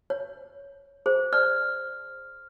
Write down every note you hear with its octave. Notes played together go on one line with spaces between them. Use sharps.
C#5
G#4 C5
D5 F6